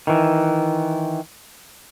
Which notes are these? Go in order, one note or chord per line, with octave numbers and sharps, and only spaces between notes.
D#3 E3